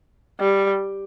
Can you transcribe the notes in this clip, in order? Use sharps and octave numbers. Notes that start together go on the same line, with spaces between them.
G3